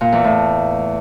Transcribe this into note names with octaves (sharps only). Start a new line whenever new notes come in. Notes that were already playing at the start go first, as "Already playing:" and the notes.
A#2
E2
A2